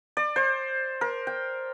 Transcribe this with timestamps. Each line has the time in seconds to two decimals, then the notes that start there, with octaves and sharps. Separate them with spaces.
0.17 D5
0.36 C5
1.01 A#4
1.27 G5